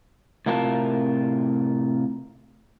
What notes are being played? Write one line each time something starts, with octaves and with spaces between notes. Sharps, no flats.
A2 C3 F4 A#4 C5 A5